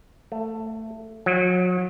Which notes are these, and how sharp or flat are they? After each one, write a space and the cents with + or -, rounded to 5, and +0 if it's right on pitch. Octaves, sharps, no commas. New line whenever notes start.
A3 +15
F#3 -35